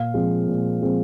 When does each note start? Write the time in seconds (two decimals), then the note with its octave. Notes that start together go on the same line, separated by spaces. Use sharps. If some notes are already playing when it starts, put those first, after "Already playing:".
Already playing: A#2 F5
0.14 F3 G#3 C4
0.47 A#2
0.81 F3 G#3 C4